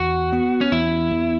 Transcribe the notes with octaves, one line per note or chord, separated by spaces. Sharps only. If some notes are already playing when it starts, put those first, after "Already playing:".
Already playing: E2 F#4
B3
C#4
E2 E4
E2